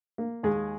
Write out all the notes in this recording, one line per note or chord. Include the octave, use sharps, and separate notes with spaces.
A#3
D#2 G#3 G#4